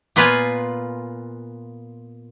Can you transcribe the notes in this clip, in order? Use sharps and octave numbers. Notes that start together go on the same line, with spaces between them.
A#2 B3 F4 B4 F5 G#5